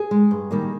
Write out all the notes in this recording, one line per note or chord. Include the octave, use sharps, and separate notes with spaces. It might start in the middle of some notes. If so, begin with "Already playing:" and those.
Already playing: G#4
G#3
G2
D#3 G3 A#3